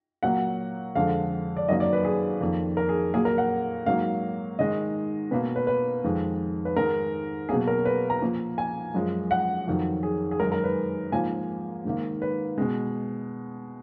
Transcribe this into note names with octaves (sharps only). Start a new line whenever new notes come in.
A#2 F#3 A#3 F#5
F2 D3 G#3 F5
D5
F#2 D#3 F#3 A#3 D#5
D5
B4
G#4
F2 D#3 A#3
A#4
G#4
A#2 F#3 A#3 G#4
A#4
F#5
G#2 F#3 A#3 F5
G#2 D#3 G#3 D#5
B2 A#3 B4
B4
B4
F2 D#3 G#3
B4
G#2 D#3 G#3 A#4
B2 F#3 A#3 G#4
A#4
B4
A#5
A#2 F3 A#3
G#5
F#2 F3 G#3
F#5
F2 D#3 F#3
G#4
G#4
F#2 D#3 G#3 A#4
A#4
B4
G#2 F3 A#3 G#5
G#2 D#3 A#3
B4
B2 G#3